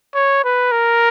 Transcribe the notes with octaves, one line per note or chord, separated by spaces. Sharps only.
C#5
B4
A#4